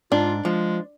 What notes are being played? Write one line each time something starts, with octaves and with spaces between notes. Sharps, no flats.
G#2 D4 F4
F3 G#3